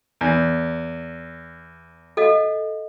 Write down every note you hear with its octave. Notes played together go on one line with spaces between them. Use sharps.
E2
A4 D#5 F5